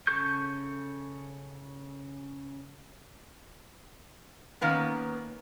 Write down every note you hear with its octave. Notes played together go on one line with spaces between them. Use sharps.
C#3 A4 C#6 G6
D#3 A#3 B3 C#4